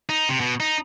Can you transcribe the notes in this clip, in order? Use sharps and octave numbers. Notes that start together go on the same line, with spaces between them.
D#4
C3
B2
D#4